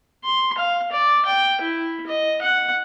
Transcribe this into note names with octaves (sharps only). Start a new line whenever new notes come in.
C6
F5
D5
G5
E4
D#5
F#5